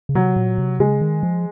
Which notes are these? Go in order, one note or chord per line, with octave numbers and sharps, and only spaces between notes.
C#3
C3 F#3
A#2
C3
C#3 G#3
D#3
F3